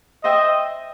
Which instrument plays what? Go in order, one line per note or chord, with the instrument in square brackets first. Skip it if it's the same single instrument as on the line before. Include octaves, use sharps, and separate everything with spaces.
[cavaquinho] C5 E5 G5 [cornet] D#5